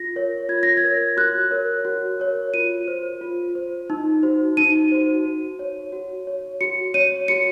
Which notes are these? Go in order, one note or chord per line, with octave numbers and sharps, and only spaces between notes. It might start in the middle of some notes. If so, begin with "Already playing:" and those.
Already playing: F4 A#6
A#4 C#5
F4 G#6
A#6
G#6
A#4 C#5
F#4 F#6
A#4 C#5
F#4
A#4 C#5
F4 D#7
C5
F4
C5
D#4
F#4 C5
D#4 D#7
F#4 C5
F#4
C#5
F#4
C#5
F#4 C#7
C#5 D#7
F#4 C#7